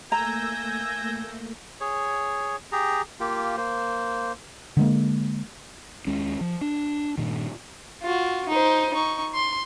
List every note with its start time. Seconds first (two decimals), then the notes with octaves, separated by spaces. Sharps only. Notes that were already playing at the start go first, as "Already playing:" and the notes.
0.12 A3 A#3 G#5 A#5 E6 G6 A#6
1.81 G#4 C#5
2.72 G4 G#4 A#5
3.20 A#3 F4 G4
3.57 A#3 C5
4.77 D3 G#3 A#3
6.07 D#2 G#3 C#4
6.41 F3
6.61 D4
7.18 G2 A#2 D#3
8.03 F4 F#4
8.49 D#4 C5
8.94 D#4 C#6
9.34 C6